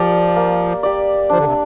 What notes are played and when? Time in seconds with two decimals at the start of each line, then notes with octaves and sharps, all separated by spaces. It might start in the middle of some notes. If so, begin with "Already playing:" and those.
Already playing: F3 A#3 G4 D5
0.36 A#3
0.83 G4 D5
1.29 F3 D4
1.38 D3
1.45 C3